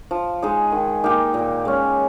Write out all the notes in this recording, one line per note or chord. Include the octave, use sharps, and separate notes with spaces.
F3
G#3 D#4 G#4
D#3
A#3 D#4 G4
A#2
G#3 C#4